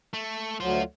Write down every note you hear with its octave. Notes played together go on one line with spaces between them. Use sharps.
A3
D2 F#3 F4 C5